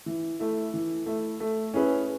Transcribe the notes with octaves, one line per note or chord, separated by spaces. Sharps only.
E3
A3 E4
E3
A3 E4
A3
C#4 E4 G#4 B4